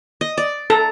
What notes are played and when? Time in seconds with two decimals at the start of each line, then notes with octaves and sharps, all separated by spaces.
0.21 D#5
0.37 D5
0.70 A4 A#5